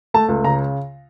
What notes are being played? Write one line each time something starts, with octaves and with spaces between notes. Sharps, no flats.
A3 A5
C#2
C#3 A#5